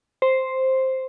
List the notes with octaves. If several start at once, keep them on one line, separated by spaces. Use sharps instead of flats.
C5